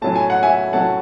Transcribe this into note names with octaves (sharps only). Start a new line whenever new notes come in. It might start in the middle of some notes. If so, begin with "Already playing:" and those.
A2 F#3 C#4 A5
G#5
F#5
E5 G#5
A2 F#3 C#4 F#5 A5